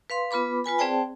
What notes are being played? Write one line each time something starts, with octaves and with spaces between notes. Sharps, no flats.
B4 F5 C6
B3 F4 B4 B5 D6
F4 B4 G#5 B5
C4 G#4 C5 D5 G5 A5